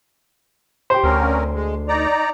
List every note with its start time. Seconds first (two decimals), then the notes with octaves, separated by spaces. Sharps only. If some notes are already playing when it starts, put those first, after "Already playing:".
0.90 G4 C5
1.04 D2 C4 C#4 A#4
1.54 G#3
1.88 D#4 D5 A#5